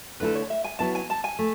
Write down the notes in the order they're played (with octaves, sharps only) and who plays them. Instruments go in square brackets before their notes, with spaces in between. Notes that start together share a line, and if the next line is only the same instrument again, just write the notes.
[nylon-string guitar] D3 A3 E4 A4 [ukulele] B4
[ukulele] C#5
E5
G#5
[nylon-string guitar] F#3 B3 E4 B4 [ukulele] A5
[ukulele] G#5
A5
G#5
[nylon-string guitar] A3